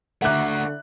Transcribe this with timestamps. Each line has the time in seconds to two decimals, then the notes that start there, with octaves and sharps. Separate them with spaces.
0.22 D3 A3 E4 F#4 D5 F#5 A#5 F#6